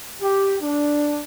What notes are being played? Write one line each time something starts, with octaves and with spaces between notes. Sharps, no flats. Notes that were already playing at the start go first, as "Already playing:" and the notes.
G4
D4